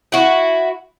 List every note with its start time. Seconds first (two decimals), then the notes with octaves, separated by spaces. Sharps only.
0.12 E4 F#4